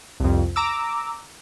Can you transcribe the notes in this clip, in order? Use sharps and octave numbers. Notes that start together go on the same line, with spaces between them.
C2 F2
A#5 D6 E6